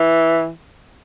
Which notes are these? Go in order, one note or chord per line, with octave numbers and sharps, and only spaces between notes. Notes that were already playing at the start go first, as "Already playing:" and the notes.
Already playing: E3